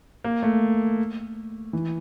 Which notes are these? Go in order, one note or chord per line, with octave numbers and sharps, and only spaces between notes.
A#3
A3
E3